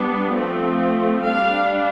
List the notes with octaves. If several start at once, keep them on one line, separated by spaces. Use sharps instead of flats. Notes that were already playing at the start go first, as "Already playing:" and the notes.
Already playing: G3 B3 D4
F3 A3 C4
G3 D4 F5